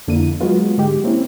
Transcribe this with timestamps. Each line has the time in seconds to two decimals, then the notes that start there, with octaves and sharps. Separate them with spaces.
0.08 F2 D3 A#3 E4 D#7
0.40 F#3 G#3 A#3 B3 F4 F#4
0.77 G#2 D3 G#3 G4
1.04 A#3 C4 C#4 E4